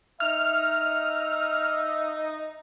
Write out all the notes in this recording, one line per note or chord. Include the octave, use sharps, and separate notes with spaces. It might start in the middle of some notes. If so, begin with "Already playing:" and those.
D#4 E5 F6